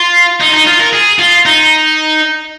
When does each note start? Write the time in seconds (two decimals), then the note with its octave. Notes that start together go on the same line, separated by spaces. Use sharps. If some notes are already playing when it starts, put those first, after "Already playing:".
Already playing: F4
0.40 D#4
0.53 D#4
0.67 F4
0.80 A#4
0.93 G#4
1.19 F4
1.46 D#4